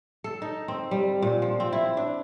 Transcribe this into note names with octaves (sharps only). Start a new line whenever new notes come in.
A4
D#4
C4
G3
A#2
F3
C4
E4
D4